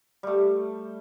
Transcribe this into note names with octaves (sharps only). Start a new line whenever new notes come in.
G3 A3